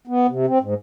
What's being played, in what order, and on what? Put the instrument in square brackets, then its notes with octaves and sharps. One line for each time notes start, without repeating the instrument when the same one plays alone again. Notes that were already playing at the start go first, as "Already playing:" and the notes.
[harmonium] B3
C3
C4
G#2